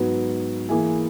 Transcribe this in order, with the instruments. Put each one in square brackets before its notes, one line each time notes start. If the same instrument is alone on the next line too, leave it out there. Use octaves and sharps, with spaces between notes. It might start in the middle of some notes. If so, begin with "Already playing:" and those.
Already playing: [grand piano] G#2 F#3 B3
E3 A#3 E4 G#4